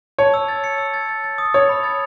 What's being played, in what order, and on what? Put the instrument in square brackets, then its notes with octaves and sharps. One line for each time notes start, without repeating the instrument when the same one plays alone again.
[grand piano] C#5 [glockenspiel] A5
[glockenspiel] E6
A6
C#7
E6
A6
A6
A6
D#6
[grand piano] C#5 [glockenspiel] D#6
[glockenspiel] B5
A6